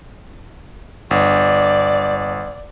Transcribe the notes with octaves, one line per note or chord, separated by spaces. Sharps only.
G1 D5